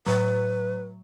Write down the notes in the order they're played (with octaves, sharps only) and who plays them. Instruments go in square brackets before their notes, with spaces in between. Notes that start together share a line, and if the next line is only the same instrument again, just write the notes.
[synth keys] A2 F#3 [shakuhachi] B4